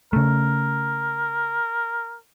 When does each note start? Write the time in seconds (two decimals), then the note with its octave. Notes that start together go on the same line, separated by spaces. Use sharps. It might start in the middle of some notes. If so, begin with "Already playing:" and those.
0.13 C#3 A3 A#4